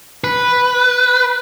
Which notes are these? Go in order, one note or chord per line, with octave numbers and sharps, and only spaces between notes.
B4